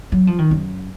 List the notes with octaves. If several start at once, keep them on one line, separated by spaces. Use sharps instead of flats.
F#3
F3
D#3
F#2